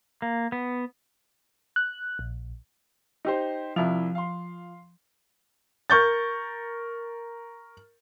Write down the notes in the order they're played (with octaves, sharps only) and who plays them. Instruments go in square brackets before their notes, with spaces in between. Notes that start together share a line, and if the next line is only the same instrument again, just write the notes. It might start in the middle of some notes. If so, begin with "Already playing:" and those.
[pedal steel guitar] A#3
B3
[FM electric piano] F#6
A#1
[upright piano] D#4 G4 C5
[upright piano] C2 E4 F7 [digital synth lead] F3
[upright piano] F5 C6
[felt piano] A#4 C#6 G6 A6